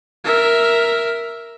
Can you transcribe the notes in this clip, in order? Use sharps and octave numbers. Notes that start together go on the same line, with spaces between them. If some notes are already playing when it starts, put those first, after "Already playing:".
A#4 E5